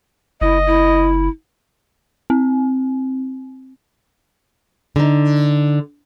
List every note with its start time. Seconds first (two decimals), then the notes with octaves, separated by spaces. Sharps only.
0.41 F#1 E4 D#5
0.66 E4
2.30 C4
4.96 D3 D#4